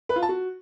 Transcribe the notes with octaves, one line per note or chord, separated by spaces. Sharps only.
B4
F4
A5
F#4